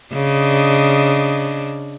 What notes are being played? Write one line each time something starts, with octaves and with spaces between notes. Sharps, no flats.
C#3 D4 D#5